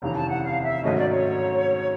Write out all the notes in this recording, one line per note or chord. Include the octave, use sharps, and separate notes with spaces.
F1 D#2 C#3 E3 A#5
A5
F#5
F5
E5
G#2 D#3 F#3 A3 C#4 D#5
D5
C#5